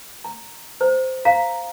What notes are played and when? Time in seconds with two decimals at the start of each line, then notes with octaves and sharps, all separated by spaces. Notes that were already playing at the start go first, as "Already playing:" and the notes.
0.25 A#5
0.81 C5 A#5
1.25 F5 A#5